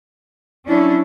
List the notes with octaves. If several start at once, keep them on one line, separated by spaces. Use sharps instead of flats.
F#3 C#4 D4 E4